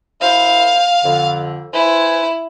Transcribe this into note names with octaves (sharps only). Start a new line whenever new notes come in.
F#2 E4 C5 F5
F2 D3
E4 B4 C5 G#5